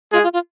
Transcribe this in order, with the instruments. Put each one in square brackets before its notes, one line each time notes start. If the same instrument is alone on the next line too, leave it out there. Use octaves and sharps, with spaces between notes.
[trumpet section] G#3 G#4 [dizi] F4
[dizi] F4
F4